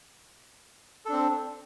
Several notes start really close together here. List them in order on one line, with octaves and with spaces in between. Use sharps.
A4 D4 C4